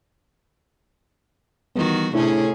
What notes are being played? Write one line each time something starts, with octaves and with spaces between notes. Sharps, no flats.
D#3 E3 G3 B3 F#4
A2 C3 C#4 D4 E4 G#4 A4